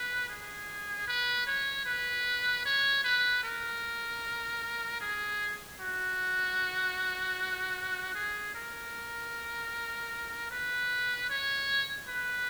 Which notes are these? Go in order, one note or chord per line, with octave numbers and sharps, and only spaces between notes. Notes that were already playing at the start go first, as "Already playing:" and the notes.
Already playing: B4
G#4
B4
C#5
B4
C#5
B4
A#4
G#4
F#4
G#4
A#4
B4
C#5
B4